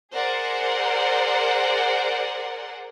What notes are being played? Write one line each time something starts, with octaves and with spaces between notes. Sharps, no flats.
G#4 A#4 C5 D5 F#5